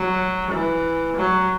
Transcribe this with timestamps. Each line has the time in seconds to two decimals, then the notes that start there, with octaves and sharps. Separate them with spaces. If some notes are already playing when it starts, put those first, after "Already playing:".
Already playing: F#3
0.51 E3
1.16 F#3